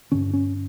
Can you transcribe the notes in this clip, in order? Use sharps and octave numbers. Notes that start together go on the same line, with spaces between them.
G2 D3 C#4
C#4